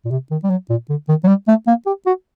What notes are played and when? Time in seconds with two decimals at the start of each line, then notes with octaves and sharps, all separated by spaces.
0.05 A#2
0.11 C3
0.31 D#3
0.43 G3
0.50 F#3
0.69 A#2
0.89 D3
1.09 D#3
1.24 F#3
1.28 G3
1.48 A3
1.67 A#3
1.86 G4
2.06 F#4